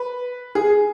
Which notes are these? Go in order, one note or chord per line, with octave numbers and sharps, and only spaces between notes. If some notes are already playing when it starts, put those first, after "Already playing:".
Already playing: B4
G#4